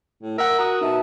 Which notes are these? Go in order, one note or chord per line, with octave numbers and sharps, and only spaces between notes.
A2
A#4 E5 F#5
F#4 A#5 D#6
B2 D#4 E5 A5